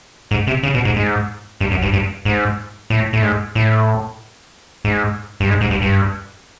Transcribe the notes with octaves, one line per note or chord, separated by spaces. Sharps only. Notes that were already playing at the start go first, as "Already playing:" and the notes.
G#2
C3
C#3
B2
G#2
G#2
G2
F#2
G2
G2
G#2
A2
A2
G#2
A2
G#2
G2
G#2
G#2
G2
G2